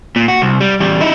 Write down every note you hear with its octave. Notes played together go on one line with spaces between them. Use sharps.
A#2
F#4
C2
G3
E2 G3
D#4 E4